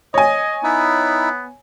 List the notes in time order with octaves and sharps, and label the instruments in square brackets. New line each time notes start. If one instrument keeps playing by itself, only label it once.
[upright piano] C#5 G#5 [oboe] D#5
[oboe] B3 [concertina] D#4 E4